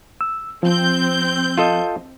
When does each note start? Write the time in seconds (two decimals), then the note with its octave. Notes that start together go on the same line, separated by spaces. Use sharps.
0.21 E6
0.63 F3 C4 G6
1.58 F4 A4 D#5